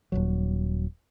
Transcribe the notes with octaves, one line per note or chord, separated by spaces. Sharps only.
D#1 C#2 F#3